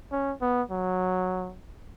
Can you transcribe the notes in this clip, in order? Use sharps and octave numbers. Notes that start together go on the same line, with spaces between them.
C#4
B3
F#3